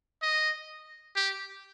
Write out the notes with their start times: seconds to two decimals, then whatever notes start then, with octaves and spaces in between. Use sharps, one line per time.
0.22 D#5
1.16 G4